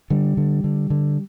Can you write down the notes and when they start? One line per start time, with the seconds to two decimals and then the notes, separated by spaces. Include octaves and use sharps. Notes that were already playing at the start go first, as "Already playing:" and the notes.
0.10 D3 G3
0.37 D3
0.64 D3
0.90 D3